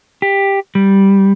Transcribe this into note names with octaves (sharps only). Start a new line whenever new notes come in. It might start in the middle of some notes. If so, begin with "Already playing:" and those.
G4
G3